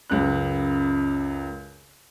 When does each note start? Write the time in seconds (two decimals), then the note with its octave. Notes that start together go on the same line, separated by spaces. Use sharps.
0.10 C#2 F#2 F#6